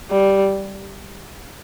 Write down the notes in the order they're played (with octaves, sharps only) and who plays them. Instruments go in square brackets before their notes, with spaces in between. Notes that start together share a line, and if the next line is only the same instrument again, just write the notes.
[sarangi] G3